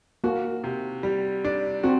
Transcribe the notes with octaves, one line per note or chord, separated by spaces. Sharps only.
A#3 F#4
C3
G3
D4
C4 F#4